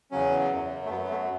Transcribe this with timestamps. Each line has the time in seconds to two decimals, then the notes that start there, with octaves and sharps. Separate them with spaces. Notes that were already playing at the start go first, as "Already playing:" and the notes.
0.11 E2 C#3 F#3 C#4
0.51 F#2 F#3
0.85 A3
0.90 F#2 F#3 B3
1.04 B3
1.10 A3